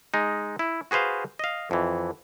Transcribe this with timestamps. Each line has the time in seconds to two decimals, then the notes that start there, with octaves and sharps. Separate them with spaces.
0.14 G#3 D#4
0.59 E4
0.91 F#4 G#4 B4 C5 F5
1.39 D#5 F5
1.71 F2 E3